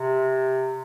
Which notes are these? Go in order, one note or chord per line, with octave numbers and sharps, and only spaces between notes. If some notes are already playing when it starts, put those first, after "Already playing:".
Already playing: C3